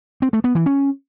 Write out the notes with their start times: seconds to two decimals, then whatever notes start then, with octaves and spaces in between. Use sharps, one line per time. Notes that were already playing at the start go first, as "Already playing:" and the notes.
0.22 C4
0.33 A3
0.44 B3
0.55 E3
0.66 C#4